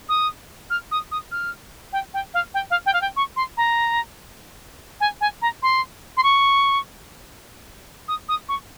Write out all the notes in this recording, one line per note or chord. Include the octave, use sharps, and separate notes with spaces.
D#6
F6
D#6
D#6
F6
G5
G5
F5
G5
F5
G5
F5
G5
C#6
C6
A#5
G#5
G#5
A#5
C6
C6
C#6
D#6
D#6
C#6